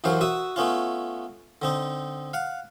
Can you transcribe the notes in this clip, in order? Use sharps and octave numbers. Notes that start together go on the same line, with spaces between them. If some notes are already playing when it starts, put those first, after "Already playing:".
A1 F#2 E3 F#3 C5 F5
F#4 E5 D#6
A3 B3 C#4 F4
D3 C4 D#4
F5 F#5